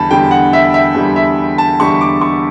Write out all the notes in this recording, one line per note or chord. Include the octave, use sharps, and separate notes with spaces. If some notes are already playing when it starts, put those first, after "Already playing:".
Already playing: E2 D3 G3 A5 B5
E2 D3 G3 G5
F#5
E5
E5
E2 D3 G3
E5
A5
E2 D3 G3 C#6
D6
C#6